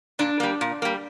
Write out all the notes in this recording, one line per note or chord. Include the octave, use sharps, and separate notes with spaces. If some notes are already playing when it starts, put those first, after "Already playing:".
A#2 D4
G3 A#3
A#2
G3 A#3